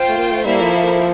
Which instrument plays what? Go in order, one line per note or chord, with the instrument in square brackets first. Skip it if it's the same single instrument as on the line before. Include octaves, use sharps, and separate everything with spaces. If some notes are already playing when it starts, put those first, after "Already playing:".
Already playing: [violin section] F4 C5 G5
[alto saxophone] A3
A#3
A3
[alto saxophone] G3 [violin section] A#3 E4 A4 C5 E5
[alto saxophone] F3